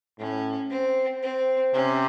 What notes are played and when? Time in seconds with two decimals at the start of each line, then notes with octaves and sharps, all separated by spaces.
0.19 A2 C#4
0.70 C4
1.23 C4
1.74 C3 C#4